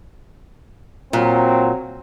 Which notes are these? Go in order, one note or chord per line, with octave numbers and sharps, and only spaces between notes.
A#2 F#3 C4